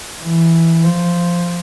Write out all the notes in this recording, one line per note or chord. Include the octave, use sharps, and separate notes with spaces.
E3
F3